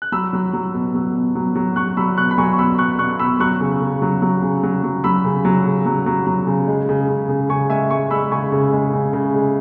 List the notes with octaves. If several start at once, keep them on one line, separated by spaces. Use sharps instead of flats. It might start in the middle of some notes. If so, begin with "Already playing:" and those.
F#6
F#3 B5 E6
F#3
F#3
B2
F#3
B2
F#3
F#3
F#3 C#6 F#6
F#3 B5 E6
B2 C#6 F#6
B5
F#3 G#5 C#6
C#6
B2 B5 E6
B2 C#6 F#6
B2 C#6 F#6
B2 B5 E6
F#3 C#6 F#6
C#3
C#3
F#3
F#3
C#3
F#3
F#3
F#3 B5 E6
C#3
F#3
C#3
F#3
F#3
F#3
C#3
G#3
C#3
C#3
C#3
C#3 G#5 C#6
G#3 E5 G#5
G#3 G#5 C#6
G#3 B5 E6
C#3 G#5 C#6
C#3
G#3
C#3
C#3
G#3